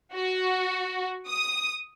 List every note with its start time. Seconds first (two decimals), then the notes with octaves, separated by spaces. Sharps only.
0.13 F#4
1.27 D#6